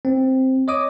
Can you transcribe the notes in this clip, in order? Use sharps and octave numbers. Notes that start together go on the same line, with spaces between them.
C4
C#5 D#5 D6 D#6